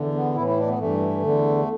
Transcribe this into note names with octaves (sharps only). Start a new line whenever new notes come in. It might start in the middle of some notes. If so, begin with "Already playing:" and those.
Already playing: E2 D3
B3
A2 E3 E4
E4
D4
B3
G2 E3 A3
E2 D3